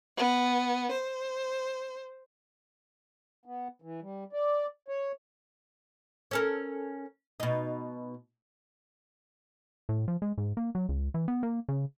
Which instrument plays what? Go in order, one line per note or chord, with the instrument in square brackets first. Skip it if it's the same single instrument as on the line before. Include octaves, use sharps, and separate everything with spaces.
[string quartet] B3
C5
[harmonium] B3
E3
G3
D5
C#5
[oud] C#4 A4 A#4
B2 D#4
[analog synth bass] A2
F3
G#3
G#2
A#3
F#3
C#2
E3
B3
A#3
C#3